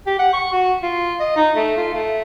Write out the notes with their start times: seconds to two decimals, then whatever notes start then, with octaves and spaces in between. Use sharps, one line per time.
0.07 G4
0.19 F#5
0.33 C#6
0.52 F#4
0.82 F4
1.20 D#5
1.36 D#4
1.55 A3
1.77 F4
1.93 A3